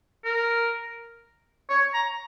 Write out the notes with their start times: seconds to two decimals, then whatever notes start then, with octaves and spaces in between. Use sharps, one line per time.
0.25 A#4
1.70 C#5
1.94 A#5